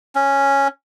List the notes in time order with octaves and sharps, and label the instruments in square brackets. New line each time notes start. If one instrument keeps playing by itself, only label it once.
[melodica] C#4